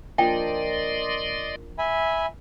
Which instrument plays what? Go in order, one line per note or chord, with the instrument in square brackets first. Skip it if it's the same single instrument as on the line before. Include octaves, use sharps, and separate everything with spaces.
[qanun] F3 A#3 D4 [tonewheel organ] D5 D#5 C6 [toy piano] G5
[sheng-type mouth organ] E5 G#5 B5